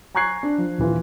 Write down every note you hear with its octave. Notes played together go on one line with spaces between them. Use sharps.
G#5 A#5 C#6 F#6 G#6 C7
D4
F3
D#1 E3 F4